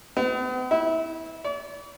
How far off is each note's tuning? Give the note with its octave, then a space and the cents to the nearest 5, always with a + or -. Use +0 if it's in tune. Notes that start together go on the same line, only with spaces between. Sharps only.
B3 +45
E4 -25
D5 -45